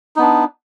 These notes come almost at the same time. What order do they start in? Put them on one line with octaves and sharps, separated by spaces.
D#4 B3 D4